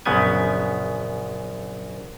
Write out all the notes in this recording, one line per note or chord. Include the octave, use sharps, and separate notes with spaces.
A#1 F#2 C#3 B3 G#5